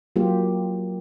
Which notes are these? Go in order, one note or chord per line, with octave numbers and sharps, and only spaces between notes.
F#3 A#3 F4 G4